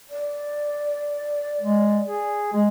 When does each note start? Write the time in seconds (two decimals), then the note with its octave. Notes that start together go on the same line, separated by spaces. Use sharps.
0.10 D5
1.60 G#3
2.05 G#4
2.53 G#3